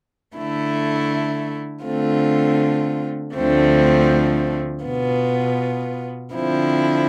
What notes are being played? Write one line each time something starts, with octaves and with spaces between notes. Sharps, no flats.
D3 A3 E4
D3 A3 C4 F4
D2 D3 F3 A3 C4
B2 B3 F4
D3 F3 C4 E4